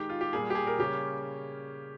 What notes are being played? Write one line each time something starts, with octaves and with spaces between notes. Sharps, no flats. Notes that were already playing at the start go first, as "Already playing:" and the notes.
Already playing: D#3 G#3 D#4 G4
F4
G4
A#2 G3 A#3 G#4
G4
G#4
A#4
C#3 G3 A#3 C#4 G4